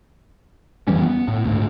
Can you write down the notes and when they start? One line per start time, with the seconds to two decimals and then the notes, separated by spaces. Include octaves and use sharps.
0.88 F2 E3 G3 C#4
1.02 B3
1.28 A2
1.44 D2 G#2